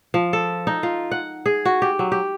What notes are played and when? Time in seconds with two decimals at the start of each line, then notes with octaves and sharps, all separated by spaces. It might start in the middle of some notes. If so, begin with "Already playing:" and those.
0.14 F3
0.33 A4
0.67 D#4
0.83 F4
1.11 F#5
1.46 G#4
1.65 F#4
1.82 G4
1.99 F#3
2.12 G4